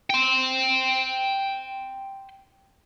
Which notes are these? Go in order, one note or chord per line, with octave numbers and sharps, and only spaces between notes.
G5 C6